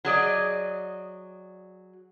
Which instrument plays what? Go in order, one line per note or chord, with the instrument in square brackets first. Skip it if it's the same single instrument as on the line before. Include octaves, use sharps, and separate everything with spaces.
[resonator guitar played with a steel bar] F#3 G#4 D5 D#5